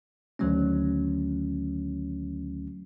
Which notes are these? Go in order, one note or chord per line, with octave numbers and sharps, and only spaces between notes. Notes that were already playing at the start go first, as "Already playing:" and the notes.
D2 D3 D#3 F#3 A3 C#4